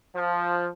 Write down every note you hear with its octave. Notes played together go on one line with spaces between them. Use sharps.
F3